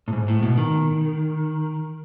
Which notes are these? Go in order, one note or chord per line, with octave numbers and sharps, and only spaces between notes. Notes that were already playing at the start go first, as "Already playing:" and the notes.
A2
G#2
A2
B2
D#3